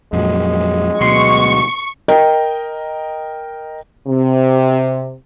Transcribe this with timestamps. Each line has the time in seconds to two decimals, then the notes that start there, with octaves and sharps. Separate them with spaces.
0.13 F2 A#2 F#3 G#3
1.01 D2 B2 F#3 C6 C#6
2.08 A#4 D#5 G5
4.07 C3